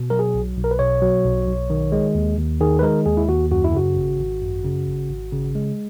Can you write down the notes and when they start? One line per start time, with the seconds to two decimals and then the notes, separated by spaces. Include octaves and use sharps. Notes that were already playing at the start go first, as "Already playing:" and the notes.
Already playing: B2
0.10 F#3 A#4
0.19 G#4
0.34 B1
0.57 B1
0.64 A#4
0.71 B4
0.79 B2 C#5
1.02 F#3
1.25 B1
1.47 B1
1.70 D#3
1.92 G#3
2.15 D#2
2.38 D#2
2.60 D#3 G#4
2.79 B4
2.83 G#3 A#4
3.06 D#2 G#4
3.17 E4
3.28 D#2 F#4
3.51 F#2 F#4
3.64 E4
3.74 C#3 F#4
3.96 G#1
4.19 G#1
4.42 F#2
4.64 C#3
4.87 G#1
5.09 G#1
5.32 C#3
5.55 G#3